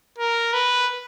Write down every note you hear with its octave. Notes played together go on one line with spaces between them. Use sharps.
A#4
B4